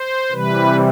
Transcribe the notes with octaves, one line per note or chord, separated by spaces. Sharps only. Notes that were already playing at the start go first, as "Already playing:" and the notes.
Already playing: C5
C3 E3 G3 B4